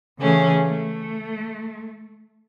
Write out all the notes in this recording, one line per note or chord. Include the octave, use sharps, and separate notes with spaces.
C#3 E3 A3 C#4 G#4
A3